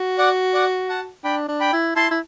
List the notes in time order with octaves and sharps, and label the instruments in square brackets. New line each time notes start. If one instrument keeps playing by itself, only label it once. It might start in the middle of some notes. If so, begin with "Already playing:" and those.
Already playing: [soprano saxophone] F#4
[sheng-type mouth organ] D5 F#5
D5 F#5
F#5 A5
[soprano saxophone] D4 [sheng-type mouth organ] G5 B5
[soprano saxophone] D4
[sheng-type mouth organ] G5 B5
[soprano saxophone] E4
[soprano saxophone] E4 [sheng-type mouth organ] A5 C6
[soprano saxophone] E4